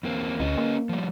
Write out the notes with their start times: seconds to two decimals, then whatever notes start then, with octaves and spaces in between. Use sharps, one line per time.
0.03 E2 A#3 C4
0.40 D2 C#4 B4 D#5
0.58 A#3
0.89 F3 G3